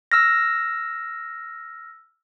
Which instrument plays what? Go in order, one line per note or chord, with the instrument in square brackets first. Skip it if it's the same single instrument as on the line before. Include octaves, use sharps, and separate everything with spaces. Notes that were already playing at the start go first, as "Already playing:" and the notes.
[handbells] E6 F6 A#6